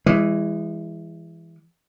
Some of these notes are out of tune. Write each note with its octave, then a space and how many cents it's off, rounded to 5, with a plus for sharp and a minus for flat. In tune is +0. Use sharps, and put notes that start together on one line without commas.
E3 +10 G#3 -30